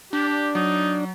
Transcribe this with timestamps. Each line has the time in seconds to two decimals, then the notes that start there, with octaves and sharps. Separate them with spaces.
0.13 D4 G4
0.55 F#3 D#4